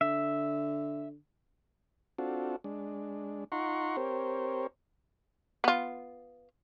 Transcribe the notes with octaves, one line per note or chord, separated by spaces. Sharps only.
D3 E5
C4 D4 F4 F#4 A4
G#3 D4
D#4 F4 F#5 A#5 C6 C#6
C4 G4 A#4 C5 C#5
B3 F4